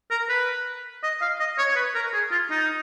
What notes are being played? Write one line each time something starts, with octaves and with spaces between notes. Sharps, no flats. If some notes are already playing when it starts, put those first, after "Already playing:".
A#4
B4
D#5
F5
D#5
C#5
C#5
B4
A#4
G#4
F4
D#4